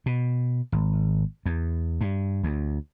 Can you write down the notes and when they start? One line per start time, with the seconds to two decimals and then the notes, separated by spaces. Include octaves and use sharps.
0.06 B2
0.72 G#1
1.46 E2
2.01 G2
2.43 D2